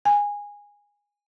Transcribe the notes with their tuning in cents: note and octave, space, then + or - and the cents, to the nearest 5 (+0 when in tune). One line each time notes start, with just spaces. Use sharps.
G#5 -15